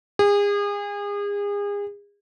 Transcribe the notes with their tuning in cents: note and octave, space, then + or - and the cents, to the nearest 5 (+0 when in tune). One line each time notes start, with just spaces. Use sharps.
G#4 -35